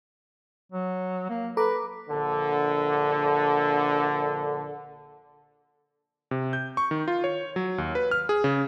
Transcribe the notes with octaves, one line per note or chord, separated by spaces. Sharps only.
F#3
A#3
A4 B4 A#5 D6
A#1 D3
C3
G6
C#6
D#3
F4
C#5
F#3
D#2
B4
F6
G#4
C#3